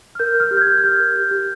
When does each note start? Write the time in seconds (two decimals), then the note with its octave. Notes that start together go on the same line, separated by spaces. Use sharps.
0.15 F6
0.19 A#4 G6
0.35 A#4
0.40 F6
0.51 G4
0.57 G6
0.61 G#6
0.67 G4
0.78 F6
0.84 G4 G6
1.00 A#4
1.16 G4
1.31 G4